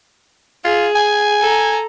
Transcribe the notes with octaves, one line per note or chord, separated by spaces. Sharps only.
F4 G#4
G#5
A4 A#5